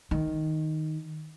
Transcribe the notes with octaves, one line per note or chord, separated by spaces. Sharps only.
D#3